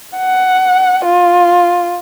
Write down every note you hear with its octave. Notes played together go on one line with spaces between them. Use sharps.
F#5
F4